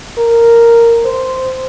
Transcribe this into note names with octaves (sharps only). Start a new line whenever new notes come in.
A#4
C5